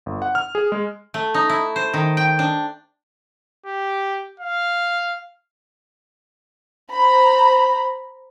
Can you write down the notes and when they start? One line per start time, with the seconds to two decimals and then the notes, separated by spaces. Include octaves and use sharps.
0.06 G1
0.22 F#5
0.35 F6
0.55 G#4
0.72 G#3
1.14 A3
1.34 D#4
1.49 E4
1.76 C5
1.94 D#3
2.17 G5
2.39 D4
3.66 G4
4.40 F5
6.92 C5 A#5 B5